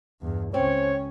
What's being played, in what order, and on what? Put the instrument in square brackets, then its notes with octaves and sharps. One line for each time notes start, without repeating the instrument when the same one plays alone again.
[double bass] E2 G2
[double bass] C#2 C#4 [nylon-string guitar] C4 [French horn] C#5